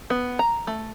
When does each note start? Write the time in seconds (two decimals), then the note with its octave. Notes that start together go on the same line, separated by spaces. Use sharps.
0.10 B3
0.39 A#5
0.67 A3